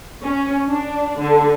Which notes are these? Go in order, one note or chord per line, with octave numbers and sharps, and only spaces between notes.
C#4
D4
D3